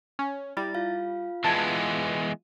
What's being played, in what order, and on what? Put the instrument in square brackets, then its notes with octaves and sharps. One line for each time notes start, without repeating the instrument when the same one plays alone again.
[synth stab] C#4
[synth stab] G3 [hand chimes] E4 A6
[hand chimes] F4 F5
[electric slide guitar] E3 G#3 B3 [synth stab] A5 G#6